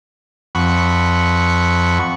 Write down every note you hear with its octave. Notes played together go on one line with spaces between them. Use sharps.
F2 F#5 B5 C#6